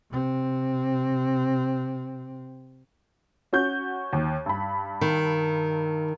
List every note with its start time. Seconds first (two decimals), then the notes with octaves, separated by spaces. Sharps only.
0.11 C3 C4
3.53 C#4 F#4 G6
4.13 D#2
4.46 G2 B5
5.01 D#3